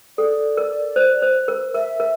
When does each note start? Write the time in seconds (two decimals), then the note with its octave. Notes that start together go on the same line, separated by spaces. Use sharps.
0.18 A4 D5
0.57 A#4
0.96 C5
1.22 C5
1.48 A#4
1.74 A#4 E5
2.00 A#4